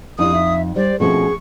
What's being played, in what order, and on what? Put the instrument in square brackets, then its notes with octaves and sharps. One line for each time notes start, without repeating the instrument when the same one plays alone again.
[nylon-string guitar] F2 [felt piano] D4 E4 G4 [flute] D#6
[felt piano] D#4 [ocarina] E5
[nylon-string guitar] G3 [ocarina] C5 [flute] D5
[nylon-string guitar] B2 C#4 [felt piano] F3 A3 C4 [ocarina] G#4 [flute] C#6